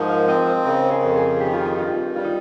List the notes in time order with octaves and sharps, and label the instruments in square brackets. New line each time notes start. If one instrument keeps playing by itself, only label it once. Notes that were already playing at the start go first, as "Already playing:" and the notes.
Already playing: [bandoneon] G#2 F3 [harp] A#4 C#5 D#5
[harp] F5
[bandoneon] C4 [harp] D#5
[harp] C5
[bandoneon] C#3 [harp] A#4
[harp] G#4
[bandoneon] F2
[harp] G#4
[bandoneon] D#3 [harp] G4
[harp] F4
D#4
[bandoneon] G2 [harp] F4
[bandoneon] G3 [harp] F4
[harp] D#4